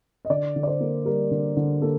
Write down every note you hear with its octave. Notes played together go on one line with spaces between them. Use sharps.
D#5
D3 D5
D3
D5
C5
A#3
G3 A#4
D3
D3
A#3 A4